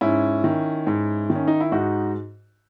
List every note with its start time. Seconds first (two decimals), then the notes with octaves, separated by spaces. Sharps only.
0.01 G#2 C#4 E4
0.44 D#3
0.87 G#2
1.30 D#3
1.35 C#4
1.48 D#4
1.60 E4
1.72 G#2 D#4 F#4